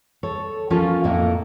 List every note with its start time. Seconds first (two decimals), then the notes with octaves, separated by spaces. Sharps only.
0.23 A4 C#5
0.70 F3 A#3 C#4 F4 A4 C#5
1.04 F2 A2 A#3 D#4 A4 A#4